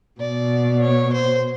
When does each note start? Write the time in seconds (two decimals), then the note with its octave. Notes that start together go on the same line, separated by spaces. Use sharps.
0.20 B2 D5
0.81 C#5
1.12 C5